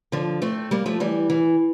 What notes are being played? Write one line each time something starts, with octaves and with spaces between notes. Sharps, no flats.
D3 F3
A3 C4
G3 A#3
F3 A3
E3 G3
E3